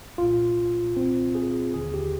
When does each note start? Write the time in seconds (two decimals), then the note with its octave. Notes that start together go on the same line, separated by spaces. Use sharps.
0.18 C2 A#2 F4
0.97 C4
1.35 G#4
1.74 D#2 D3 G#4
1.94 G4